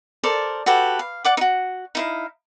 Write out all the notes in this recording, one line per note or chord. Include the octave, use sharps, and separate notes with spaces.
A4 A#4 C5 D5
F#4 G4 A4 B4
F5
D5 F#5 D6
D#4 F#4
D#4 E4 F5